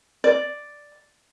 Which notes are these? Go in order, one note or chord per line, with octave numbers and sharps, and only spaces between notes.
D5